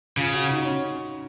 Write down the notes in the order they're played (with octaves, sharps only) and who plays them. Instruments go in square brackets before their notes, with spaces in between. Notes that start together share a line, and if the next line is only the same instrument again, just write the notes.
[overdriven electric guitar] C#3 [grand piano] F4
[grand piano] F#4
D#4
C#4